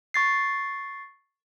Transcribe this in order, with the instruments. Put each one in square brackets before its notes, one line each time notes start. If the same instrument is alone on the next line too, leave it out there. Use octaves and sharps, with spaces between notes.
[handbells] C#6 A6 C7